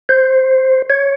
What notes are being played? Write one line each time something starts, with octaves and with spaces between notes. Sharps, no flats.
C5
C#5